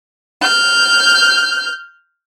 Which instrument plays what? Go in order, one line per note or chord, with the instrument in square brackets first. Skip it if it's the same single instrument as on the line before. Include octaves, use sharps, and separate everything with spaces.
[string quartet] F6 G6